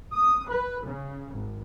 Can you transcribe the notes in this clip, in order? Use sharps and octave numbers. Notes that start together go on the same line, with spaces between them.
D#6
B4
C#3
G#1